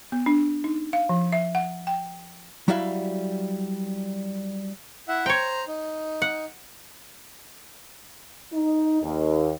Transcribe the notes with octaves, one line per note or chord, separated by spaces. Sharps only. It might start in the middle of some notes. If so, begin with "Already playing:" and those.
B3
D4
D#4
F5
F3
E5
F#5
G5
F#3 G3 E4 F#4 E5 F5
E4 E5 F#5
C5 C#5 G5 A#5
D#4
F#5
D#4
D#2